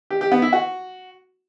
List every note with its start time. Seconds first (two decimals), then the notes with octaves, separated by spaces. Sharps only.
0.10 G4
0.21 G4
0.32 B3
0.42 E4
0.53 F#4